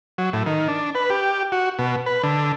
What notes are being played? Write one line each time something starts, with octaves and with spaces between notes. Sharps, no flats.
F#3
A2
D#3
D4
B4
G4
F#4
B2
B4
D3